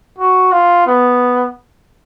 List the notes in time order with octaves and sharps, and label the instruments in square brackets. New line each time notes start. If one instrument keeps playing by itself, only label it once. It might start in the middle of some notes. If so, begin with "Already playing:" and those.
[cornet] F#4
F4
B3